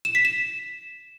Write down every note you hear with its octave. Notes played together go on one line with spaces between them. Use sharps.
E7
B6
E7